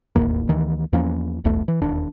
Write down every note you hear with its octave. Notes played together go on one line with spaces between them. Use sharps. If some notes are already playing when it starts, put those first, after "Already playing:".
E1 A1 D#2 A#3
D2 D#3 E3
E2 F3 A#3 C#4
D1 B1 E2 A3
E3
E1 D#2 D4